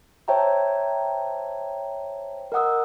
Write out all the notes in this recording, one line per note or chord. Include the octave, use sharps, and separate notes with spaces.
C5 C#5 E5 G5 A5 A#5
A#4 D#5 F#5 D#6 E6